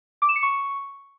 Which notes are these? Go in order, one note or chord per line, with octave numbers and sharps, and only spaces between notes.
D6
E7
C#7
C#6